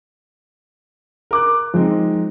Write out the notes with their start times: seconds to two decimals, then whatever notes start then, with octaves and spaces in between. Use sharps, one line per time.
1.31 A#4 D6 F#6
1.74 F3 G#3 C4 D#4